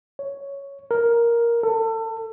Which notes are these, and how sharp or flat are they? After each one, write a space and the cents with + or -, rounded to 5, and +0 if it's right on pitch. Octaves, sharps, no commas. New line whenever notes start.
C#5 +5
A#4 +5
A4 +30